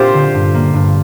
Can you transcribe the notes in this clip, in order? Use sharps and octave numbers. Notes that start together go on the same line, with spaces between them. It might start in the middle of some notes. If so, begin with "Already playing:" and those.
Already playing: A#2 D4 F4 G4 C5
D3
G2
A#3
G2